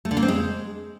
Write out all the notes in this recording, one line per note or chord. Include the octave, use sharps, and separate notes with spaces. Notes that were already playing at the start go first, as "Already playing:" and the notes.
A3
D3
A#3
C4
G#3